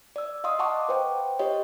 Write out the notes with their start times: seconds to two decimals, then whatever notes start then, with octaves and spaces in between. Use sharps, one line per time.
0.16 D5 E6
0.44 D#5 F5 C6 D#6
0.59 D#5 F5 F#5 A5 C#6 D6
0.89 B4 C5 G5
1.39 G4 C5 C#5 D#5